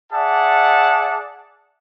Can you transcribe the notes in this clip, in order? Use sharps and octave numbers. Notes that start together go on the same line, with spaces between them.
G#4 D5 E5 F#5 A5